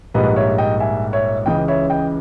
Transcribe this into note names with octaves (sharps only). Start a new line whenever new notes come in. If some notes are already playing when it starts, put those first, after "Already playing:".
A#1 G#2 G3 A#3 B4 D#5
C#5 E5
D#5 G5
E5 G#5
C#5 E5
C#2 C#3 E3 D#5 G5
C#5 E5
D#5 G5